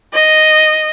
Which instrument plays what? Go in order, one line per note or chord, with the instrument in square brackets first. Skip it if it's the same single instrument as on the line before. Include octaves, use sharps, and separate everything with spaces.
[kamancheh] D#5